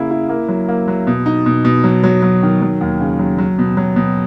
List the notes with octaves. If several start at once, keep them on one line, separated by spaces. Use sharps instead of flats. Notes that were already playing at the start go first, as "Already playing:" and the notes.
Already playing: C#3 A#3 E4
E4
A#3
F#3
A#3
F#3
B2
D#4
B2
B2
F#3
F#3
F#3
D#3
F#3
D#2
C#3
F#3
F#3
B2
F#3
B2